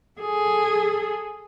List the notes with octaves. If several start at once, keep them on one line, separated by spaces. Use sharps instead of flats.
G#4 A4